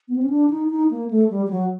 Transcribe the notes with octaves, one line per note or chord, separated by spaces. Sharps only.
B3
C4
C#4
D4
D#4
D#4
A#3
A3
G3
G3
F#3